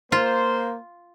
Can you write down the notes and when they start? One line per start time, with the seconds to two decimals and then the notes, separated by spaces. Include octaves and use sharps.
0.12 A#3 F4 C5